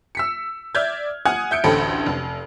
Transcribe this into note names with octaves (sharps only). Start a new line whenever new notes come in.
E6 B6 C#7
D5 E5 F6 G6 G#6
F#5 G#5 D#6 F6 F#6 G#6
E5 G6 C#7 D7
A1 D2 A4 C5 G5 B5
F1